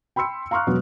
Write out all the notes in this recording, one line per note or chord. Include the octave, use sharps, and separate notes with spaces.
G5 B5 C6 E6 C#7
F5 A#5 C6 C#6 F6 F#6
E1 F#3 B3